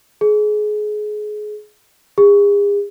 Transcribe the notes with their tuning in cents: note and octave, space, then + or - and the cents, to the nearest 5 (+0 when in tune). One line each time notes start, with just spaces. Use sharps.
G#4 +25
G#4 -40